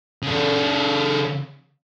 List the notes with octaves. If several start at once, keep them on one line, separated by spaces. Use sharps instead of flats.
C#3 A4